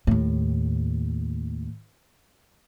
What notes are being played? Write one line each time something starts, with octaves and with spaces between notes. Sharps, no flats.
D#2 A2